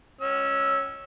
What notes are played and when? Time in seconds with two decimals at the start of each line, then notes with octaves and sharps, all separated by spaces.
0.21 C#4 E6